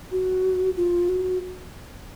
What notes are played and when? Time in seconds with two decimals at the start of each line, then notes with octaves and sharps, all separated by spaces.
0.11 F#4
0.77 F4
1.09 F#4